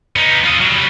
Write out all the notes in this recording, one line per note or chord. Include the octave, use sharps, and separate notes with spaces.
B3 D#4
F4 D#5
F#3 G3